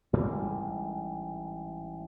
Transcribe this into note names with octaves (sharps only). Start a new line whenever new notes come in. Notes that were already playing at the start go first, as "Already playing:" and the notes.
A1 G#2 G3 G#3